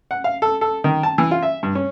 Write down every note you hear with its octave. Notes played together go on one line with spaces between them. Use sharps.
F#5
F5
A4
A4
D#3
A5
E3
F4
E5
G2
C#4